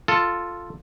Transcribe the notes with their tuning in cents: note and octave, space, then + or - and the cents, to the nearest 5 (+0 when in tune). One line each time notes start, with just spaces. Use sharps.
F4 +0 A4 +0